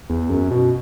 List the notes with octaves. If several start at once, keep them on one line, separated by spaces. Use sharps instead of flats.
E2
F#2
B2